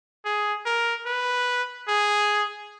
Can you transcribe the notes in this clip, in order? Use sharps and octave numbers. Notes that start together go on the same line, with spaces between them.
G#4
A#4
B4
G#4